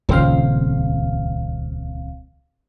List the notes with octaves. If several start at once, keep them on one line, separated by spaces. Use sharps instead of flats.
D#1 C#2 F3 C4 F5